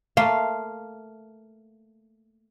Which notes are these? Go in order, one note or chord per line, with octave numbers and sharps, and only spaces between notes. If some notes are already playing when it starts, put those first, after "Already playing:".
A3 A#3 F5 C6